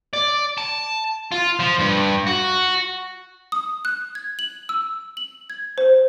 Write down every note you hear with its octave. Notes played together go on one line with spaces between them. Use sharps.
D5
A5
F4
F3
G2
F#4
D#6
F#6
G#6
F#7
E6
F#7
G#6
C5